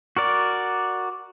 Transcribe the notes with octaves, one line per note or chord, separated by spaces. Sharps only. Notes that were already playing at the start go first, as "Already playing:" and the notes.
F#4 A#4 D5